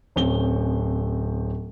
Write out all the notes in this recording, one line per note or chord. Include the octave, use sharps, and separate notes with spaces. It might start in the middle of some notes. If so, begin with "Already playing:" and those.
D1 C4 C#4 G7